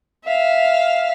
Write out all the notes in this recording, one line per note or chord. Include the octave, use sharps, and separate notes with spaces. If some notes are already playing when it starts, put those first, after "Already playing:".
E5 F5